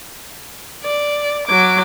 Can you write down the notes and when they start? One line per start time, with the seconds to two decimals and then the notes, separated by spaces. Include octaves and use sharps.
0.84 D5
1.47 F#3 D6